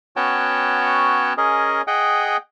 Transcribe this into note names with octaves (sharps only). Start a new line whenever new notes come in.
B3 C#4 F#4 C#5 G5 A5
C#4 G#4 A#4 D#5
G#4 D#5 F#5 G5